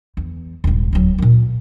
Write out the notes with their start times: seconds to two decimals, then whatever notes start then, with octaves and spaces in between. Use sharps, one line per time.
0.17 E2
0.64 D#1 G#2
0.93 D1 F#3
1.18 A#2 A#3